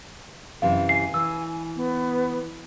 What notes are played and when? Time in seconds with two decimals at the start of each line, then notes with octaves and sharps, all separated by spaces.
0.62 F#2 C3 E3 F5
0.89 G#5 C7
1.14 E3 E6
1.76 B3